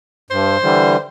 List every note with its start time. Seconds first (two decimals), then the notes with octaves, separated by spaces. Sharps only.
0.30 G2 C5
0.62 D3 E3 G3